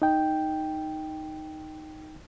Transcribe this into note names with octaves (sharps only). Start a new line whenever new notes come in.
D#4 G5